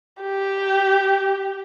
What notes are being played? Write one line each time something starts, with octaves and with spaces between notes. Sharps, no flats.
G4